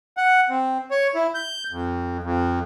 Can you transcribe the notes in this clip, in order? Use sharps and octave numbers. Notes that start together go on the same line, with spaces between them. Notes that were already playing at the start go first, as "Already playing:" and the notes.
F#5
C4
C#5
E4
G6
F2
F2